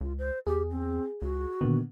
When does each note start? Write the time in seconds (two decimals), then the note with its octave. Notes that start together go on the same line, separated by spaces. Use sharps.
0.01 C#2 F4
0.18 C5
0.47 E2 G4 G#4
0.70 C4
1.22 C#2 F#4
1.61 A#2 D3 D#3 B3